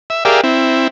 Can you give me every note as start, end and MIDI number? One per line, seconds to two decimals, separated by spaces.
0.10 0.25 76
0.25 0.41 67
0.25 0.41 68
0.25 0.41 70
0.25 0.41 74
0.25 0.41 76
0.25 0.41 77
0.44 0.88 60
0.44 0.88 64